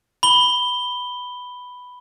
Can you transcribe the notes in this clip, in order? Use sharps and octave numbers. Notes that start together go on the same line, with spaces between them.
B5 G7